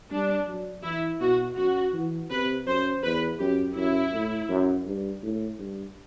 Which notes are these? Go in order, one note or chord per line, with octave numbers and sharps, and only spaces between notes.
G3 D4
F#3
E3 E4
B2 F#4
F#2 F#4
E3
C3 B4
F#2 C5
E2 B4
F#2 G4
F#2 E4
A2
F#2
G2
A2
G2